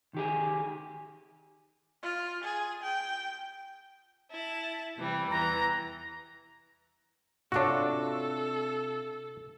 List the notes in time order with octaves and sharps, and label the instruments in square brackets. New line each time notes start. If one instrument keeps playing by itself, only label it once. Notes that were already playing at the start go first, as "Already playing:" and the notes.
[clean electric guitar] D#3 G4 G#4
[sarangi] F4
G#4
G5
[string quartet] E4 A5
C3 E3 G3
[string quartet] E2 E3 [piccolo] A#5
[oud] C3 F4 C#5 [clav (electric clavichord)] D4 F#4 [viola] A4